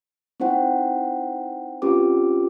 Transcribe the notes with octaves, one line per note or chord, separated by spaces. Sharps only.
C4 D#4 E4 C5 F#5 G5
C4 C#4 F4 G4 B4 D6